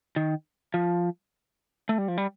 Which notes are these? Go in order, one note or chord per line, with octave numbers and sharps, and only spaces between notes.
D#3
F3
A3
G3
F3
G3